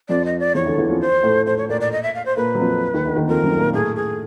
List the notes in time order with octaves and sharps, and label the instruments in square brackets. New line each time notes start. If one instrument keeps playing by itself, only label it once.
[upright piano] F2 F3 [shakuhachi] D5
[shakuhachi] D#5
D5
[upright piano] E2 E3 [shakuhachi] C#5
[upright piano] D2 D3
E2 E3
F2 F3
[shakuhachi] C5
[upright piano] A2 A3
[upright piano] A2 A3 [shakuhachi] C5
[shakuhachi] C#5
[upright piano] A#2 A#3 [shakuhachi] D5
[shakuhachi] D5
D#5
E5
F5
C5
[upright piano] A#2 A#3 [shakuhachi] B4
[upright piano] F#3
F2 F3
D#2 D#3
D2 D3
D#2 D#3
[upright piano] F2 F3 [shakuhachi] A#4
[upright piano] F#2 F#3
A#2 A#3
[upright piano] A2 A3 [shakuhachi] G#4
[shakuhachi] G#4